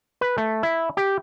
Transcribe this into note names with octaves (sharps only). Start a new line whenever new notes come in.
B4
A3
E4
G4